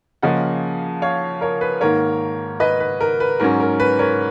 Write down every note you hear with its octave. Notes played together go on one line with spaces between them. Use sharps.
C#3 F3 A#3 C#4 D#5 F#5
C#5 F5
A#4 C#5
B4
G#2 D#3 A#3 A#4 C#5
B4 D#5
B4
A#4
B4
G#2 F#3 C#4 A#4
A#4
B4
A#4 C#5